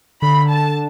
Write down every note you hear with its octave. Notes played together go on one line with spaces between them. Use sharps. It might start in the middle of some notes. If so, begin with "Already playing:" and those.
D3 B5
A5